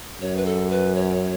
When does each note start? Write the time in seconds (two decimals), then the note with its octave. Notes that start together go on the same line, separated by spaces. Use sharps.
0.21 F#2 C#5
0.37 B4
0.46 A4
0.71 B4
0.96 C#5